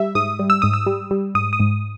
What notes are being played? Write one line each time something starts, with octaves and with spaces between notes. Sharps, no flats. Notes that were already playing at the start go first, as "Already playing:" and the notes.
Already playing: G3 E5
G#2 D#6
G3
E6
G#2 D#6
E6
G3
G3
G#2 D#6
D#6
G#2